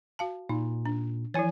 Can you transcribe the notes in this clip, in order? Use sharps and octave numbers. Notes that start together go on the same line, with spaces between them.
F#4 F5 A5
A#2 D#4
D4
E3 F3 E4 C#5 G#5